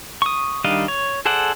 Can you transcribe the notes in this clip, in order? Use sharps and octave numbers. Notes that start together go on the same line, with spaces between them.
C#6 D#6
D#3 G3 D4 D#5 F5
C#5
G#4 A4 C5 D5 F#5